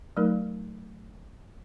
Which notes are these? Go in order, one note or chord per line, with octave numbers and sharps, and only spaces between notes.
F#3 A3 D#4 A#4